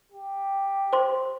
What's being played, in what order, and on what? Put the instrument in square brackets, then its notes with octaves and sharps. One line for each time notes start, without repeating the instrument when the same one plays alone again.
[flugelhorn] G4
[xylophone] C5 C6